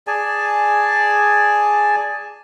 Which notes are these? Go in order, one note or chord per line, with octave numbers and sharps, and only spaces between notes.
G#4 D5 G#5 A5